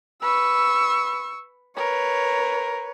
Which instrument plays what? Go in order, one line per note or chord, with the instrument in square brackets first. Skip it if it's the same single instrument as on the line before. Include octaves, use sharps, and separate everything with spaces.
[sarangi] B4 [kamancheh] C#6 E6
[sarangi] A#4 [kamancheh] B4 C#5